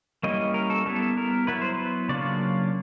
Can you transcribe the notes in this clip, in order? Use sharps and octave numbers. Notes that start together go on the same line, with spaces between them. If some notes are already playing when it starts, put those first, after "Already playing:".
G3 A#3 C#4 E4 D#5
A#4
A4
G3 B3 E4 A4
A#4
F#3 B3 E4 B4
C5
B4
C#3 F#3 A#3 D4 F4 D5